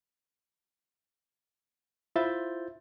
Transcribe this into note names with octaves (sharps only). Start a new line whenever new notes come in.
E4 F4 C5 E5 G6 A6